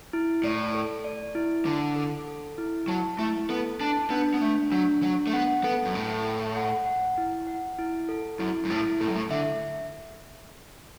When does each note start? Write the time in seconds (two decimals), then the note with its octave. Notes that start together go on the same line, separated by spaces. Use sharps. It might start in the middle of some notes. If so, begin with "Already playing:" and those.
0.13 E4
0.44 A2 D5
0.75 A4
1.04 D5
1.35 E4
1.66 D3 A5
1.96 A4
2.27 A4
2.58 E4
2.88 F#3 A5
3.19 A3 E4
3.49 B3 A4
3.80 D4 A5
4.10 B3 D4
4.34 B3
4.41 A3 D4
4.71 F#3 D4
5.02 F#3 D4
5.27 A3
5.33 B3 F#5
5.64 B3 A4
5.85 F#2
5.94 A2 A4
6.25 A4
6.56 F#5
6.86 F#5
7.17 E4
7.47 F#5
7.79 E4
8.09 A4
8.39 F#2 E4
8.65 F#2
8.70 A2 E4
9.01 A2 A4
9.08 F#2
9.16 A2
9.31 D3 E5